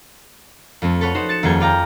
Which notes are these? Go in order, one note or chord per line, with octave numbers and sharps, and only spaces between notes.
F2 A3 C4
A4 B4 C#5 F#5
D#4 F#4 C5
A6 C#7 E7
D#1 F2 A#3 G#4 G6 G#6
F4 D5 F5 G5 A#5